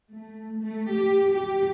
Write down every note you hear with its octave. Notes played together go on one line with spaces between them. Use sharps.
A3
A3
G4
G4